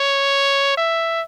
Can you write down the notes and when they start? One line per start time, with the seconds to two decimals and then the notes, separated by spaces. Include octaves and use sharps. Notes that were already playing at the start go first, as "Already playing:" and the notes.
Already playing: C#5
0.77 E5